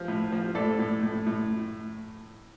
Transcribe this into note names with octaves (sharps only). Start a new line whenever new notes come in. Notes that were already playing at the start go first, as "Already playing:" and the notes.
Already playing: F3
A2
F3
A2 A4 D5
A2
A2
A2